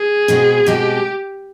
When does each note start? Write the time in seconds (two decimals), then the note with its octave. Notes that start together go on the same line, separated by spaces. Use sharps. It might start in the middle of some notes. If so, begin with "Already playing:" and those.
Already playing: G#4
0.28 B2 G#3 C4
0.66 B2 G#3 C4 G4